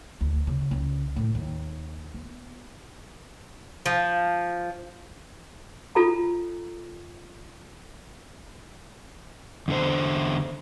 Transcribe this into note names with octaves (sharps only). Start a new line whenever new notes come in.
D2
C#3
C#2
A2
D#2
B3
F3
F4 A4 A#5 B5
E2 D3 C5